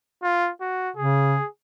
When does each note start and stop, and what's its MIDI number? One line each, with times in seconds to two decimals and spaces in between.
0.23 0.51 65
0.61 0.91 66
0.96 1.37 49
0.96 1.48 68